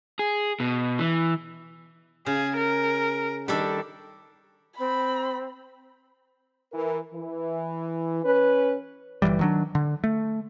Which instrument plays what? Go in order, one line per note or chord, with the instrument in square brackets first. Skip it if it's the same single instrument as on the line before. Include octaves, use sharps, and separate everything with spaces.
[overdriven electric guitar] G#4
B2
E3
[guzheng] C#3 [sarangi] G#4
[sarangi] A#4
[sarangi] D#3 [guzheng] G3 D4 A4
[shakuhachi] C4 [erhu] B5
[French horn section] E3 A#4
E3
C#4 B4
[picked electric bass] G1 D2 E3 G3
D#3 F#3 D4
D3
A3